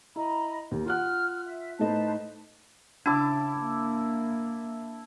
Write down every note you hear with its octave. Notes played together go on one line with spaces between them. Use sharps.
E4 D#5 A#5 B5
D#2
F4 F#5 F6 F#6
E5
A2 A3 D#4 B4 C5 A5
C#3 D4 E4 A5 D6
A#3